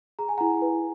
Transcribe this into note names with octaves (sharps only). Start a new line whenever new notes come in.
G#4 A#5
G#5
E4 F#5 A#5
B4